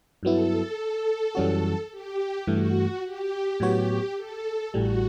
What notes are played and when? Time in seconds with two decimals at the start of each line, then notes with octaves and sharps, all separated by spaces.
0.23 G2 F#3 B3 E4 A4
1.35 F#2 E3 G3 C#4 F#4
1.92 G4
2.47 G2 E3 A3 F#4
3.05 G4
3.60 A2 F#3 B3 F#4 G4 C#5
4.17 A4
4.74 A1 A2 G3 F#4